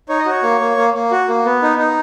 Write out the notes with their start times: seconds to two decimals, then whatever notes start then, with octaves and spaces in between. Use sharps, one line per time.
0.09 D#4 C#5
0.19 D#5
0.26 F#4 C#5
0.43 A#3
0.60 A#3
0.77 A#3
0.94 A#3
1.11 F#4
1.28 A#3
1.45 B3
1.62 D#4
1.79 D#4